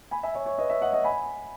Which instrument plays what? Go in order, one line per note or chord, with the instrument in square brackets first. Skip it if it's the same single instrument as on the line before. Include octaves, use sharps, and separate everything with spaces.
[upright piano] G#5 B5
E5 G#5
C#5 E5
C#5
B4 D#5
C#5 E5
D#5 F#5
D#5 F#5
G#5 B5